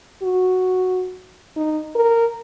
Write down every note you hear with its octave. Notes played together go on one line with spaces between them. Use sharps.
F#4
D#4
A#4